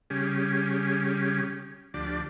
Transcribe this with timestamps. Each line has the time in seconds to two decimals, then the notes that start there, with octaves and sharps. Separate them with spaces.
0.10 C#3 G3 C#4 G4 G#4
1.94 D2 F3 D4 G4 D5 A5